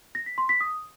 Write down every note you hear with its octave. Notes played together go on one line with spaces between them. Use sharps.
A#6
B6
C6
B6
D#6